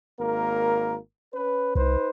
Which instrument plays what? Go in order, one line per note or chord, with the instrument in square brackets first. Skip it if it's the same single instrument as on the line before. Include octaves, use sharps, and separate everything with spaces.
[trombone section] G#1 A#3 A#4
C#4 B4
[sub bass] C2 [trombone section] D#4 B4 C5